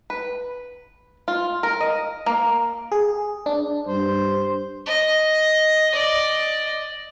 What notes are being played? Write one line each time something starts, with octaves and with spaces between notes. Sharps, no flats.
B4
F4
A#4
D#5
A#3
G#4
D4
G2 C5
D#5
D5 D#5